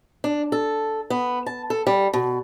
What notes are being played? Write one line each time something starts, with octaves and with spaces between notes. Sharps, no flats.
D4
A4
B3
A5
A4
G3
B2